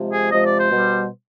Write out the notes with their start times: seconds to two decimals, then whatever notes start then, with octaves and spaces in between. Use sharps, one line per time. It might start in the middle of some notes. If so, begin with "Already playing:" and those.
Already playing: C3 F3 G#3
0.12 G#4
0.31 C3 F3 G#3 D#5
0.45 D5
0.59 C5
0.71 B2 G3